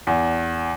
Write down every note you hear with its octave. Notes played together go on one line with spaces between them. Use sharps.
E2